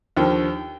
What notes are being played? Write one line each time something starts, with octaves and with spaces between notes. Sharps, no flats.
D#2 D3 F3 G5